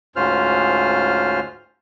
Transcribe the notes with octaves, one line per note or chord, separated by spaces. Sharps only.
D2 G#2 C#4 F4 C5 F6